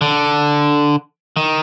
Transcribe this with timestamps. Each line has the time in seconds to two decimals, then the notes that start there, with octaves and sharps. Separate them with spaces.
0.01 D3
1.37 D#3